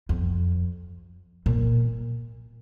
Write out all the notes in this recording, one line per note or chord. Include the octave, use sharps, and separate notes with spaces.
F2
A#2